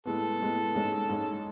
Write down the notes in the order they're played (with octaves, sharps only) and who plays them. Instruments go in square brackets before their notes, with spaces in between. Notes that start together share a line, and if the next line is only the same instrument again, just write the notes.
[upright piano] A2 G#3 B3 [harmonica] A4
[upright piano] A2 G#3 B3
G#2 G#3 C#4
G#2 G#3 C#4